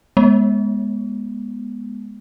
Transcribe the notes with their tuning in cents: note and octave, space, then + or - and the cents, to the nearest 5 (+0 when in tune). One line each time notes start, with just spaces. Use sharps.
G#3 +0 B3 -20